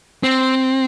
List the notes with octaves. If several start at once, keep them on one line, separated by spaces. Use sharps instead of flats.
C4